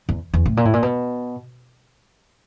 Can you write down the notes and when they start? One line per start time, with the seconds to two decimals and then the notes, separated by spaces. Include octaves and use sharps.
0.09 E2
0.34 E2
0.46 A2
0.57 A#2
0.65 A2
0.73 A#2
0.83 B2